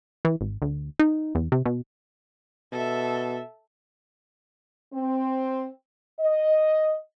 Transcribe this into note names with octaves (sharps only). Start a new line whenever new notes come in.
E3
G#1
D2
D#4
E2
C3
B2
B2 A4 E5
C4
D#5